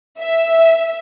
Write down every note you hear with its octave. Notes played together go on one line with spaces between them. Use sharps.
E5